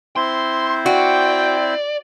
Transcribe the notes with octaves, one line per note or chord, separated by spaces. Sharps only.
C4 E4 C5 C6
F#4 D5 G5